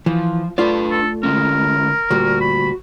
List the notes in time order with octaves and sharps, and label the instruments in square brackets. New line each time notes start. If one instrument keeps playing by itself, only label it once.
[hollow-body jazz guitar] E3 [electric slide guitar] F3
[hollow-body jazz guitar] A3 F4 D5 [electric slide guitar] D4 B4
[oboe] A4
[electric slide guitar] D3 G#3 C#4 [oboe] A#4
[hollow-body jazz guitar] D2 A#2 G3 [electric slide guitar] F#4
[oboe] B5